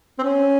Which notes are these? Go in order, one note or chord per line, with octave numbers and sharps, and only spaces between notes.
C4
C#4